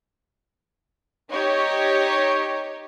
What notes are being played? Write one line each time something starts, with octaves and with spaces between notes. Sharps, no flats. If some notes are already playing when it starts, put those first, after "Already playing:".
D#4 G4 C#5